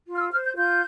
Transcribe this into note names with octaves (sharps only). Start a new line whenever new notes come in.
F4
F6
E6
C5 F6
G6
F4 G6